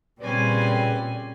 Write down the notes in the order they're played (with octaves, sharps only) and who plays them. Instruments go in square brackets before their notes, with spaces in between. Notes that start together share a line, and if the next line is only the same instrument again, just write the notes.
[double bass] A#2 [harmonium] C#3 B4 D5 [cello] G3 C4 [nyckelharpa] C#4 G#5